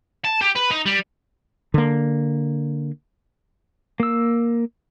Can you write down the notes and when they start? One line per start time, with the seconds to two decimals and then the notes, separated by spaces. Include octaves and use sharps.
0.24 A5
0.41 G4
0.55 B4
0.71 D#4
0.86 G3
1.74 D3 A#3
4.00 A#3 E6